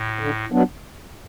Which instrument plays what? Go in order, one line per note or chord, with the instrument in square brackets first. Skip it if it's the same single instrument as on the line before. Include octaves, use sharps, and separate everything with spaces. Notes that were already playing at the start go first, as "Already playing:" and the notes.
Already playing: [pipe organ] A2
[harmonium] D3
F#3 B3 D4